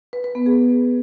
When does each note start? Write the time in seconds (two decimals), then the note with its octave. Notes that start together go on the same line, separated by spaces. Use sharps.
0.13 B4
0.24 B4
0.35 B3
0.46 G#4